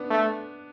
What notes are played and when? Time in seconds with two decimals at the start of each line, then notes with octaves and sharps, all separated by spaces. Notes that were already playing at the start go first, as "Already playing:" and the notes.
Already playing: B3 D4
0.10 A3